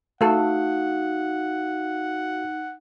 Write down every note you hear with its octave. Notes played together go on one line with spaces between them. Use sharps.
A3 D#4 F#4 A4 F5 F#5